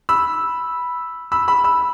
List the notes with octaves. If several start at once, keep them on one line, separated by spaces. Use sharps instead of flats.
B5 E6
B5 E6
B5 E6
B5 E6